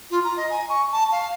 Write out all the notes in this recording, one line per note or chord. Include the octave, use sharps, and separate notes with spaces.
F4
A#5
D#5
G#5
C#6
A5
F5